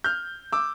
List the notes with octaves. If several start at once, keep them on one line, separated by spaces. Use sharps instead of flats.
F6 G6
D6 E6